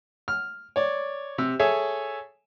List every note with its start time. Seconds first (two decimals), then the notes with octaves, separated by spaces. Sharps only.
0.28 F6
0.76 C#5 D5
1.38 C3 E6
1.59 G#4 A4 C#5 E5 G#5